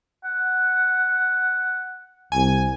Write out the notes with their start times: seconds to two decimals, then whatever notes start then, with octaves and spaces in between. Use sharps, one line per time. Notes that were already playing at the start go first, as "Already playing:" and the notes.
0.24 F#5
2.32 C2 G#5